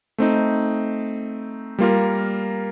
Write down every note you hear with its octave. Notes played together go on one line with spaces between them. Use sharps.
A3 C4 D#4
G3 A#3 F4 A#4